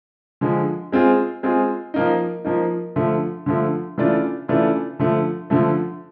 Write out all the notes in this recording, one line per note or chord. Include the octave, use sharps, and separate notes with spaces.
D3 F3 G#3
G#3 C4 F4 G#4
G#3 C4 F4 G#4
F3 A#3 D#4
F3 A#3 D#4
D3 F3 A3
D3 F3 A3
C#3 E3 A3 D4 F4
C#3 E3 A3 D4 F4
D3 F3 A3
D3 F3 A3